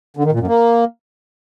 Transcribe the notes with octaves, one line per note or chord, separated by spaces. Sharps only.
D3
D#3
A#2
F#2
A#3